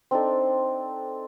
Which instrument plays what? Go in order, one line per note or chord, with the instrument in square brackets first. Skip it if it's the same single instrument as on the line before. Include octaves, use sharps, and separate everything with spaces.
[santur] C4 D4 D#4 A4